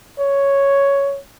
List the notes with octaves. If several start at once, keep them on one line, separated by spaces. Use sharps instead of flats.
C#5